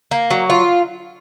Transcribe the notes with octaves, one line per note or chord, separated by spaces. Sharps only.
A#3
F#3
F4